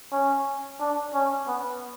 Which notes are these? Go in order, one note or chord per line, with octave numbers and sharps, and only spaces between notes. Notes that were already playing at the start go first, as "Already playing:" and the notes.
C#4
D4
C#4
B3